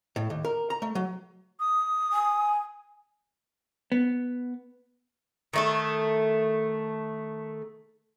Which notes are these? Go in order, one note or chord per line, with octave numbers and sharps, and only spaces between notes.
A2
D#2
A#4
A#5
A3
F#3
D#6
G#5
B3
D#3 A3 A4